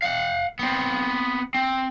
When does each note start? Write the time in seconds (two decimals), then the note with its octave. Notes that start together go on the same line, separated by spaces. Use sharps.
0.02 F5 F#5
0.59 B3 C4
1.54 C4